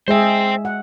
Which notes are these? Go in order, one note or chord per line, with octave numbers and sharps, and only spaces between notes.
G#3 G#4 C5 E5 G5
F#5